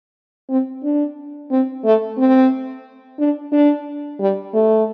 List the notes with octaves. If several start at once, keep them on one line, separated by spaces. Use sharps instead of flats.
C4
D4
C4
A3
C4
D4
D4
G3
A3